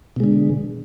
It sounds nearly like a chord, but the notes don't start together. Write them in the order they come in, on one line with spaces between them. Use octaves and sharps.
B2 G#3 D3